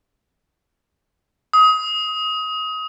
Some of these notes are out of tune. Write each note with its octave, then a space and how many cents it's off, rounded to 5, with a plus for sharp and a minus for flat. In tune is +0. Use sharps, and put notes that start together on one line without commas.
D#6 +25